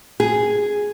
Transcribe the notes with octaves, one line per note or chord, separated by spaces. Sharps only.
G#4